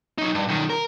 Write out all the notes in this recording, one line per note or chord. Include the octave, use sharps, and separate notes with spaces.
F#3 D#4
G2
B1 D#3
A#4